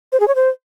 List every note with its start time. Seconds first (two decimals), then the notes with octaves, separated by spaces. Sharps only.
0.12 C5
0.20 G#4
0.28 C#5
0.35 C5